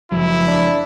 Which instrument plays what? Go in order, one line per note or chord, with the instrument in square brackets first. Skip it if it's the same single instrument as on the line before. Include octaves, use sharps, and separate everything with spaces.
[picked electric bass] F#1 F3 F#3 [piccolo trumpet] E4
[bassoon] D4